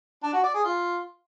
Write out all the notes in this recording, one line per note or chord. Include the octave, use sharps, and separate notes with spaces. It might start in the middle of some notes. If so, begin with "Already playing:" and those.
D4
F#4
D5
G#4
F4